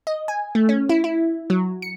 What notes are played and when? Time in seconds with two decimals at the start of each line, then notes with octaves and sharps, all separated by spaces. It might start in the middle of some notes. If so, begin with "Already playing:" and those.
0.07 D#5
0.28 G#5
0.55 A3
0.69 C#4
0.89 E4
1.04 E4
1.50 F#3
1.82 C#7